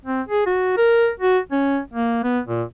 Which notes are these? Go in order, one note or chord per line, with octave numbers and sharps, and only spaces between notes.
C4
G#4
F#4
A#4
F#4
C#4
A#3
B3
A#2